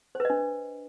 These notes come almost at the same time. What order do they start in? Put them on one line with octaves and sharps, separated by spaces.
C5 B4 D#5 D4